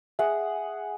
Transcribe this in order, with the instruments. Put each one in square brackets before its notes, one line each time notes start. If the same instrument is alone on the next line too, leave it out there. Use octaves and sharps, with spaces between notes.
[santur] G#4 F#5 [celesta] E5